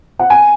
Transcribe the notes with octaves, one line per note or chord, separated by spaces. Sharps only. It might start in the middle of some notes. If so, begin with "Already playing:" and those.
F#5
G#5